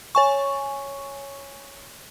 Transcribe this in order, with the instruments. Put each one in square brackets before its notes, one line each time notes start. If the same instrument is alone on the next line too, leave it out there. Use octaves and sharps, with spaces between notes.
[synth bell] C#5 G#5 C#6